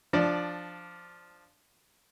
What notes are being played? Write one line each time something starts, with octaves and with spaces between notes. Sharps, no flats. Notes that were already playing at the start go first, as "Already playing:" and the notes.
F3 D4 D5